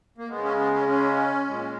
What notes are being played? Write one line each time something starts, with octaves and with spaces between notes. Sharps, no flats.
A#3
C#3 G#3 B3
C#4
B3
C#4
C#4
A#2 G#3